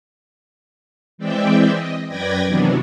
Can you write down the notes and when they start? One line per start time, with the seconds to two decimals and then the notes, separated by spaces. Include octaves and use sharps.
1.18 E3 G#3 C4 D5 E5 G5
1.69 D#5
2.08 F#2 B4 D5 G5 G#6 A#6
2.46 C3 D#3 E3 F#3 B3 D4